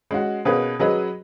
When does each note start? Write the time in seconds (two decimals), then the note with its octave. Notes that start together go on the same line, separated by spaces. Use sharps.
0.11 G#3 C#4 F#4
0.45 B2 A#3 C#4 G#4 B4
0.79 F#3 C#4 G#4 B4 D#5